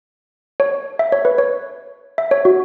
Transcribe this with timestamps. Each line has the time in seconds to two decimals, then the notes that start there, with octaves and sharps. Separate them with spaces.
0.60 C#5
0.99 E5
1.12 C#5
1.25 B4
1.38 C#5
2.18 E5
2.31 C#5
2.45 F#4